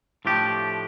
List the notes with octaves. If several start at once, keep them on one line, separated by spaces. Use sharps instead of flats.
A2 F3 A3 D4 G4